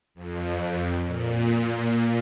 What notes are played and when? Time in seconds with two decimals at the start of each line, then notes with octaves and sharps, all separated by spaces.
0.15 F2
1.06 A#2